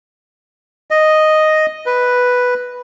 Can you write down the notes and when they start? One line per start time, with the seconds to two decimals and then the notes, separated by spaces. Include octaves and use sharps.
0.91 D#5
1.86 B4